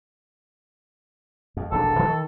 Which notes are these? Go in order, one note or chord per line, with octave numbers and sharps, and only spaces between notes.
F2
E1 A#1 D4 A4
D#3